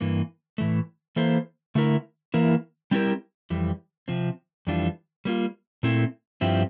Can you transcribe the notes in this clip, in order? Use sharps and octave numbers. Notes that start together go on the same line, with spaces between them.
G2 E3 A#3
A2 E3 A3
E3 A#3 E4 A4 C5
D3 A3 E4 A#4
E3 A#3 E4 A#4
G3 C4 E4 G4 A#4
F2 E3 G3
C3 F3 C4
F2 E3 G3 D4 F4
G3 A#3 F4
A#2 A3 C4 E4
G2 F3 C4 E4 G4